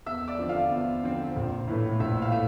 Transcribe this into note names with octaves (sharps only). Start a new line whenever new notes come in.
E2 E5 E6
D5 D6
D3 F3 C4
F4 F5
E2
D3 F3 C4
A#1
A2 E3 A3
A#1 E5
F5
A2 A3 E5